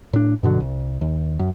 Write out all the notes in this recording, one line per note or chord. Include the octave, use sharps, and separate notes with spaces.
A2 D4
G2 B2 D3 F#3
C2
D#2
F#2